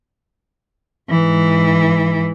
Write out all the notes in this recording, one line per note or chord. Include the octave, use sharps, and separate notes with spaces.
G#2 E3